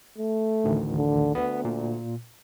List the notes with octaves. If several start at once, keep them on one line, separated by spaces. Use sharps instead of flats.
A3
A1 D2 D#3
D3
D2 B3
A#2